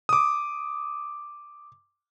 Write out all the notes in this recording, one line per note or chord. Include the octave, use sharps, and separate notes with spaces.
D6 D#6